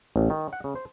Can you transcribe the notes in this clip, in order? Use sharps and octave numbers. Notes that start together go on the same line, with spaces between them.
A1
D#3
F#5
C#3
C5